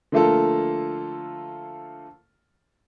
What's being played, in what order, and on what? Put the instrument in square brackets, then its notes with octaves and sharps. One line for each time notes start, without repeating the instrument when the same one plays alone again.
[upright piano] D3 F3 A3 A#3 F4 A4